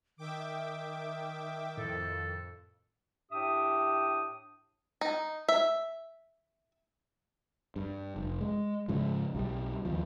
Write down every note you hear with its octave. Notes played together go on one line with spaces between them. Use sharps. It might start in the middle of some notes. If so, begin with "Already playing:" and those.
D#3 E5 G5 D6
F2 A2 A4
A2 D4 G4 E5 D#6
D#4
E5
G2
F1
G#3
G#2 C#3 F3
B1 F#3 G3
D#2 F3